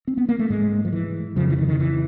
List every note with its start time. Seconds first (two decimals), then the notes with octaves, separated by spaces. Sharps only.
0.08 C4
0.17 B3
0.29 A#3
0.39 A3
0.50 G#2 G#3
0.85 F3
0.93 E3
1.36 F2 C#3 F3
1.50 E3
1.58 D#3
1.69 D#3
1.80 E3